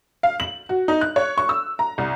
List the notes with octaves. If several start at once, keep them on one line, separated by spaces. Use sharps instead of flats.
F5
F#7
F#4
D#4
F#6
C#5
C#6
E6
A#5
C2